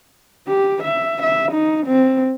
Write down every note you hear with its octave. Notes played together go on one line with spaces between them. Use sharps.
G4
E5
E5
D#4
C4